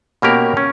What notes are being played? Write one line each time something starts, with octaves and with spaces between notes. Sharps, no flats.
B2 A#3 C#4 G4 A#4
C#4